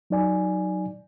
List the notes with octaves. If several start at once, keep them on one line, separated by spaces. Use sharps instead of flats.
F#3 D#4 D5 G#5